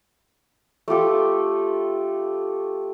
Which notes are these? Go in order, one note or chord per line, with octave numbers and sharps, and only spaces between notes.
A3 F4 G4 A4